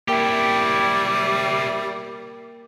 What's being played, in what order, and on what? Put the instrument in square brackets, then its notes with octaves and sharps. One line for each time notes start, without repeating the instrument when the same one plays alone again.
[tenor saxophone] G3 [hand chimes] A#3 A#4 G5 [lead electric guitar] E4 G4